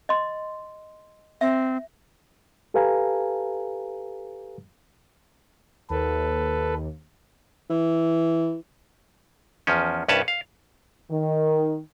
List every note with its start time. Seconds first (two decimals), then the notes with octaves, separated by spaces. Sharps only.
0.09 D#5 C6
1.41 C4 E5
2.74 G4 A4 B4 F5 G#5 A#5
5.90 D#2 A4 B4
7.70 E3
9.67 E2 F3 C#4
10.08 C2 G2 C#4 B4 C#5 A5
10.28 F5
11.10 D#3